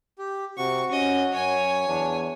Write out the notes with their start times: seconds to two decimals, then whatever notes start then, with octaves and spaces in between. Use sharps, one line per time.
0.19 G4
0.57 C3 F#4 C#6
0.92 C#4 D#5
1.32 F#2 C#5 G#5
1.87 E2 D4